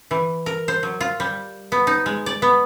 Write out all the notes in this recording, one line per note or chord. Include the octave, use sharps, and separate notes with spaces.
E3
A#4
C5
F#3
F4
G3
B3
D#4
G#3
D5
B3